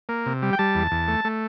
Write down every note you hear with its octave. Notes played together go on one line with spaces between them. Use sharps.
A#3
C3
G3
G5
G3 A5
E2
E2
A3
A3